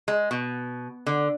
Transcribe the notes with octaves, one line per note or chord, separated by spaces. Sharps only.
G#3
B2
D3